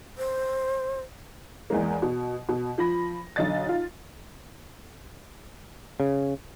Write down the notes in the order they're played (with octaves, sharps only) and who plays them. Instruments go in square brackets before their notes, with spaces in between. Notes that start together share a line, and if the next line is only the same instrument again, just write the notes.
[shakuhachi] C5
[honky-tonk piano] E2 G#3 A#3
B2
B2
F3 B5 A#6
B1 D3 D#5 A6
D#4 F4
[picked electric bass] C#3